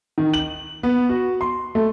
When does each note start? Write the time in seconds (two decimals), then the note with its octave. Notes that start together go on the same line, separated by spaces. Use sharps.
0.18 D#3
0.34 F#7
0.83 B3
1.09 F#4
1.41 C6
1.75 A3